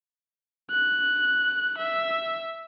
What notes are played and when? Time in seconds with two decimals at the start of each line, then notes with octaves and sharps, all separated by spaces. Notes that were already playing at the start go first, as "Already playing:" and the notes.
0.71 F#6
1.78 E5